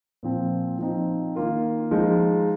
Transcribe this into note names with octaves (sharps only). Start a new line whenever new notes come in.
A#2 F3 C4
F3 C4 D#4
D#3 A#3 F4 A#4
F3 G#3 D#4